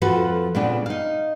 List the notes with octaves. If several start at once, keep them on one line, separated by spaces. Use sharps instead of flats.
F2 F3 F#4 A4 B4
A#2 C#3 B3 C4 D4
D#4 F5